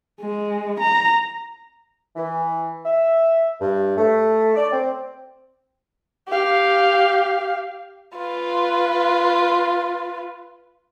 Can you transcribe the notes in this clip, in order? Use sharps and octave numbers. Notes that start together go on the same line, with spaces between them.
G#3
A#5
E3
E5
G2
A3
D5
C4
G4 F5
F4 B4